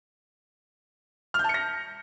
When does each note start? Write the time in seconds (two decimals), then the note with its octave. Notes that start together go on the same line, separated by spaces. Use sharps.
1.34 F6
1.39 G6
1.44 A5
1.49 C#7
1.54 A#6